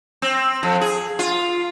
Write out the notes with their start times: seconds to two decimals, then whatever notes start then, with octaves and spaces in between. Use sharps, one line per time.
0.22 C4
0.63 F2
0.81 G#4
1.19 F4